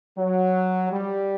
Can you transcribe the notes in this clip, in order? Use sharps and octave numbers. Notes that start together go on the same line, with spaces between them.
F#3
G3